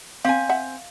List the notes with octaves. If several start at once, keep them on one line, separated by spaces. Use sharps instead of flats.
C4 F5 G#5
E5 F#5